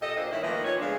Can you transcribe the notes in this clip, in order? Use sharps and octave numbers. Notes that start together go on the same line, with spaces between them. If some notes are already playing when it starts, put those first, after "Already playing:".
A#2 G4 A4 D#5
A#2 A#3 D4 F4 C5
G2 D#3 C#4 E4
D#3 F3 A3 A#3 B4 D#5
A#2 C#5
C#3 G#3 A3 B3 D4 F5